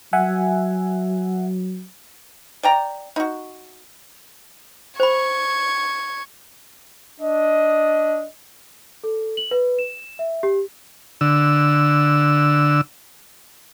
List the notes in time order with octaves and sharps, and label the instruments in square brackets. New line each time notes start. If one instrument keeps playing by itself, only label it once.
[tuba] F#3 [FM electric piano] E5 F#5 G#5
[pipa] D5 G5 A#5
D#4 F#4
[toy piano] C5 B5 [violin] C#6 G#6
[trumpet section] D4 D#5
[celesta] A4
F#7
B4
E7
E5
G4
[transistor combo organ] D3 E6